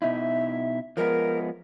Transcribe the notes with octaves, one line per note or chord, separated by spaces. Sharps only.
B2 D#4 E4 E5
F3 G#3 B3 A#4